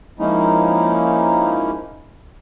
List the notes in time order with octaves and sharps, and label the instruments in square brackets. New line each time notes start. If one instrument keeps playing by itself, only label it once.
[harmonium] F3 G#3 A#3 C#4 D#4 E4